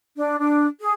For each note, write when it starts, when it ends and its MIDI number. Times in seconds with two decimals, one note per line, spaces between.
0.17 0.37 62
0.39 0.66 62
0.80 0.91 68